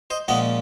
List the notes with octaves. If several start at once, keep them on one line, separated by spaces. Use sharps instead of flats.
C5 D#5
A#2 F3 G#3 C#4 D#5 F#5